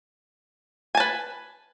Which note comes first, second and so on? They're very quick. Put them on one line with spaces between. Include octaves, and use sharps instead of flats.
G#5 A5 B4